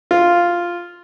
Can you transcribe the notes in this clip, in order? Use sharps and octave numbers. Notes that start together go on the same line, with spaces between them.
F4